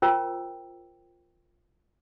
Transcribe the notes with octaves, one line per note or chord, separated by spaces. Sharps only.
F4 A#4 C5 G5 A#5 E6